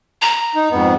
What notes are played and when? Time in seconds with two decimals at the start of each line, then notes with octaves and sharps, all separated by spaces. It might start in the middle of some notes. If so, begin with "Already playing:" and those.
0.22 A#5
0.55 D#4
0.71 F2 G#2 B3